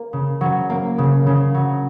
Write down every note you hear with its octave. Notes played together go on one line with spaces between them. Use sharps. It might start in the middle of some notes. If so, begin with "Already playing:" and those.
Already playing: A#3
C#3
F#3
A#3
C#3
C#3
F#3